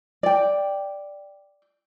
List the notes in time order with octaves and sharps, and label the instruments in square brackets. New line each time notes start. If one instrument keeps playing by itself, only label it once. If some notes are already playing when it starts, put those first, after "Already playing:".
[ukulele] D5 G5